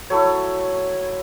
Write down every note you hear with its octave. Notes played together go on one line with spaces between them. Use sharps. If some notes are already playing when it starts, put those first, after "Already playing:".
F#3 A3 E4 C#5